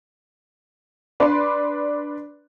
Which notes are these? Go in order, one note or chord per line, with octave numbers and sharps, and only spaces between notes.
D4 B4 C6 D6